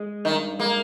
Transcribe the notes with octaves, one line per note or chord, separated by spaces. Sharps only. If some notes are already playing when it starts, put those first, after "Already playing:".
Already playing: G#3
G2 D#3
G#3 A#3